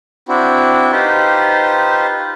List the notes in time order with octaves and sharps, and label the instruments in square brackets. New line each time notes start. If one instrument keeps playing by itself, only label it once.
[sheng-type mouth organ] C4 D4 E4 F#4
D#4 F4 G4 B4 C5